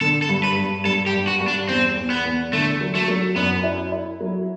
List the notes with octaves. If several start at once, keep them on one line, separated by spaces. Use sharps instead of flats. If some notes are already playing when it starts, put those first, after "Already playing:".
D3 A4
A4
G2
B4
G2
G2 A4
G4
G2
F#4
G2
D4
E2 C4
E2
B3
E2
D3 A3
F#3
A3
F#3
F#2 B3
E4
E4
F#3